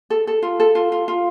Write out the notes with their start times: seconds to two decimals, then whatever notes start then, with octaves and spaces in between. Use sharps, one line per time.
0.10 A4
0.27 A4
0.42 F4
0.60 A4
0.75 F4
0.92 F4
1.08 F4